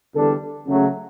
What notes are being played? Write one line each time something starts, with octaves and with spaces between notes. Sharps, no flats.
E2 D3 G3 D4 A4
C#3 F#3 A3